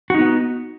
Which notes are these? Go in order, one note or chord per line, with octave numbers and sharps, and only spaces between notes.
B3 D#4 F#4